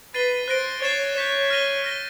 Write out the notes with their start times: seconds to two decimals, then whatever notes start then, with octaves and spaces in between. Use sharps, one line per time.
0.14 B4 A6 C7 D#7 G7
0.48 C5 F#6 A#6 D7 G7
0.82 C#5 A6 C7 E7 G7
1.16 C#5 G6 B6 E7
1.50 F6 A#6 D#7 G7
1.84 F6 A#6 D#7 G7